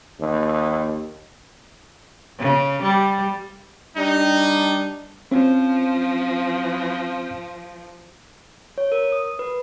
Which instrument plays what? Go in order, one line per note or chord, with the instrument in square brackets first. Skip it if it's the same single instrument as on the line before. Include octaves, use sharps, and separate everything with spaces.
[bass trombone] D#2
[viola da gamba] C#3
G3
[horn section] G3 D4 [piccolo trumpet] D#4
[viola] F3 [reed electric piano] C4 C#4
[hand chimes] C#5
A#4
D#6
B4